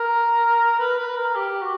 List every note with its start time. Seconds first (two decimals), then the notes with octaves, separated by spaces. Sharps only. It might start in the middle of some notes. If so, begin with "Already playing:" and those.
Already playing: A#4
0.80 B4
0.99 B4
1.16 A#4
1.36 G4
1.62 F#4